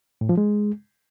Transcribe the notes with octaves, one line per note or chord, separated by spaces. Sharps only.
A2
F3
G#3